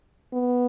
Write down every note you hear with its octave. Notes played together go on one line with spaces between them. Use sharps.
B3